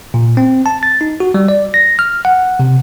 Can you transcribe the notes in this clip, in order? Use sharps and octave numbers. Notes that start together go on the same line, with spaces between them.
A#2
C4
A5
A6
D#4
F#4
G3
D5
A#6
F6
F#5
C3